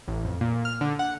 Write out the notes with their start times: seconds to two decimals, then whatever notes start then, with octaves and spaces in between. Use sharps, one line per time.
0.08 A1
0.25 F2
0.41 A#2
0.65 F6
0.81 D3
0.99 F#5